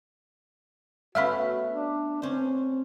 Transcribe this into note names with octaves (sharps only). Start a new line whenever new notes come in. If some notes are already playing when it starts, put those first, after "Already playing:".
A3 B3 C#4 F#4 E5 F5 B5
D4
C4 C#4 C5